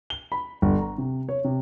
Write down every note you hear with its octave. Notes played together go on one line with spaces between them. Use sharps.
G7
B5
G1
A#5
C3
C#5
C3